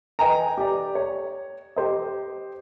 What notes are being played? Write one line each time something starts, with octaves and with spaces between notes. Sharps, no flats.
B4 D#5 G5 G#5 A#5
G4 D5
C#5
G4 C5 D#5